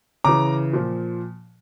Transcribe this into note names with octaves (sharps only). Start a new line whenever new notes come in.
C#3 E3 A#5 D6
A#2 F3